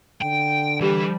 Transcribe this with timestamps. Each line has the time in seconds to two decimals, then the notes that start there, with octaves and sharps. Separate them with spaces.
0.22 D3 G5
0.80 E3 G3 B4